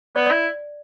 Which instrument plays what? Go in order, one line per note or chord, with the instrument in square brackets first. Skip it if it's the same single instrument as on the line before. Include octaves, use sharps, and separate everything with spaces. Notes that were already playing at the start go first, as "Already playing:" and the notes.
[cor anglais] B3 [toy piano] D5
[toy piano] D5
[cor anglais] E4